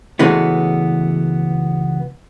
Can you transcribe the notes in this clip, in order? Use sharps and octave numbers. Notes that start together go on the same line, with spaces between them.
C#2 B2 E3 G#3 A3 B3